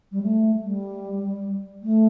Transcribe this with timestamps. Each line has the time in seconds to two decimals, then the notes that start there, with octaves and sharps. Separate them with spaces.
0.12 G3
0.22 A3
0.63 G3
1.82 A3